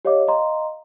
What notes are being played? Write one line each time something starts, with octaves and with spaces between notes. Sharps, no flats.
G4 C#5 D#5 F5 D6
D#5 F5 A#5 C6